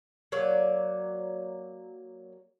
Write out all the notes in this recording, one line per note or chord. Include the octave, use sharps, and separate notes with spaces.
F#3 A#3 C#5 D5